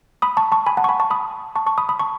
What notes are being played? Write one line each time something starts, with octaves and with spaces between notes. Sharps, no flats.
B5 D#6
A5 C#6
A5 C#6
G#5 B5
F#5 A5
C#6
G#5 B5
A5 C#6
B5 D#6
A5 C#6
A5 C#6
B5 D#6
B5 D#6
A5 C#6